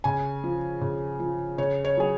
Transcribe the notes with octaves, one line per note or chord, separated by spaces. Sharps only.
C#3 G#5
F3
C#3
F3
C#3 C#5
C#5
F#3 G#4